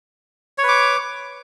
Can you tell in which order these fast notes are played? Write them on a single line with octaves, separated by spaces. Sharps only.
C#5 B4 D6